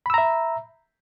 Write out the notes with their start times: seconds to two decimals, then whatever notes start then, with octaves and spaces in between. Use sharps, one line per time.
0.06 B5
0.10 E6
0.14 A#5
0.18 E5